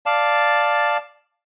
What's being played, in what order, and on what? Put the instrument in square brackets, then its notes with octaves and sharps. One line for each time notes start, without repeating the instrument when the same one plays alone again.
[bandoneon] D5 F5 A5